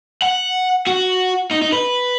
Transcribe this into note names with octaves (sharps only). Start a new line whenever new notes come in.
F#5
F#4
D#4
D#4
B4